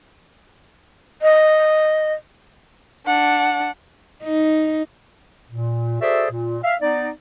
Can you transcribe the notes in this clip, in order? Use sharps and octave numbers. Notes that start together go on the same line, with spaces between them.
D#5
D4 F#5
D#4
A#2
F#4 G#4 A4 C5 D5 E5
A#2
E5 F5
B3 D#4 D5